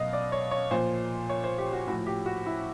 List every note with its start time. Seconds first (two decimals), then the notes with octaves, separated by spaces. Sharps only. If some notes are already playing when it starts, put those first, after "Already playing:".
Already playing: B2 F#3 D#5 F5
0.13 D5
0.32 C#5
0.51 C#5
0.71 A#2 F3 C5
1.29 C#5
1.44 C5
1.58 G4
1.73 F#4
1.87 A2 F#4
1.92 F3
2.07 G4
2.26 F#4
2.46 E4